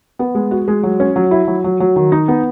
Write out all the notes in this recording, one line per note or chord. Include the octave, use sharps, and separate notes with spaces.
B3
G#3
F#4
G#3
F#3
C#4
F#3
E4
F#3
F#3
F#3
D#3
D#4
B3